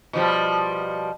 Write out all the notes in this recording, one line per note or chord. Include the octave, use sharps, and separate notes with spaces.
B2 F3 G3